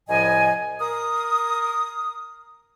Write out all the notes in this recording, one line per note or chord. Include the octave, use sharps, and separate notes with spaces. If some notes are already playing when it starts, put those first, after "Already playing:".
C2 A2 F3 D#5 G#5
A#4 D#6